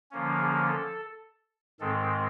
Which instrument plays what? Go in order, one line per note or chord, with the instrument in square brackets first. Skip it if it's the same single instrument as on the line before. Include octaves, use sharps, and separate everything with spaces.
[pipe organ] D3 F3 A#3 C#4
G#4
A4
G#2 D#3 G#3 C4 A4